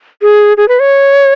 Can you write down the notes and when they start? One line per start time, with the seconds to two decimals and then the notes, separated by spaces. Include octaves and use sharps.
0.22 G#4
0.57 G#4
0.68 B4
0.80 C#5